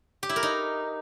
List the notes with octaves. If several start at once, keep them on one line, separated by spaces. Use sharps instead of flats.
G4
E4
A#4
D#4